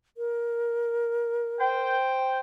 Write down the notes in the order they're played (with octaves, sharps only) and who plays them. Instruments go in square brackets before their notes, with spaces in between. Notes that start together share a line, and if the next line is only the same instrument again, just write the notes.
[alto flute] A#4
[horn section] C5 G5